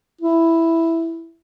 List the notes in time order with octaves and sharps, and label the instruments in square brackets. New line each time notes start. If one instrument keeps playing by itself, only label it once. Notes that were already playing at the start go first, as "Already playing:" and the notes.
[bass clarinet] E4